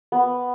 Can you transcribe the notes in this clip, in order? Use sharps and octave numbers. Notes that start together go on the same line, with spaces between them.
B3